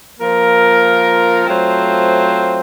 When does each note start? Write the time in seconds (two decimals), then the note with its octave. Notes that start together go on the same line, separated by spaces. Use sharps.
0.19 F3 A#3 F4 A#4
1.46 F#3 A3 C4 F4 C5